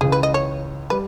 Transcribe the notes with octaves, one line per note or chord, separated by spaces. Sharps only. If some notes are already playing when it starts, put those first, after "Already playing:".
C#2 C#3 E3 G#4
B4
D#5
C#5
G3 B4